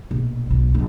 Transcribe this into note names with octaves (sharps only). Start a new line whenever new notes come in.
A#1 B2
B1
A#1